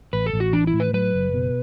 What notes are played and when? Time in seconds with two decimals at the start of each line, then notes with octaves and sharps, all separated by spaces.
0.13 A1 B4
0.26 A4
0.33 A1
0.40 F#4
0.53 E3 D4
0.67 E4
0.73 A2
0.80 B4
0.93 F#3 B4
1.14 F#1
1.34 B2